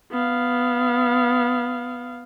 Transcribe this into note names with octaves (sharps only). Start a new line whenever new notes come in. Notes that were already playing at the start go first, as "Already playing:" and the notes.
B3 F5